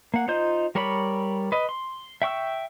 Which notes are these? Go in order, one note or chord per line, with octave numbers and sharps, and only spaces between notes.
A#3 F#5
D#4 F4 C5 D#5 G6
G3 A#4 C#5 D5 B5
B4 D#5
C6
E5 G5 C#6 E6